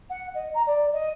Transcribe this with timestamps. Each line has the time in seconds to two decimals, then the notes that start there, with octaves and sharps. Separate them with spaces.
0.10 F#5
0.35 D#5
0.54 A#5
0.67 D5
0.93 D#5